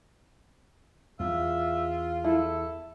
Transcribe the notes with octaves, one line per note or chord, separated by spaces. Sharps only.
E2 F4 E5
E4 A4